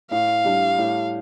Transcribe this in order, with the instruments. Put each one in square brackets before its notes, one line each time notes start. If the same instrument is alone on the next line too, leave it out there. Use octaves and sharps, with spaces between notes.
[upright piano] A2 [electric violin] F5
[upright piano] G3 D4
A2